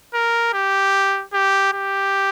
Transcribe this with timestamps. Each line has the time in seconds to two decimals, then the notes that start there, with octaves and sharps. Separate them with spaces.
0.14 A#4
0.53 G4
1.33 G4
1.73 G4